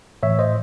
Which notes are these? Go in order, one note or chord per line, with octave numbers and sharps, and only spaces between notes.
A2 E3 C#5 E5
C5 D#5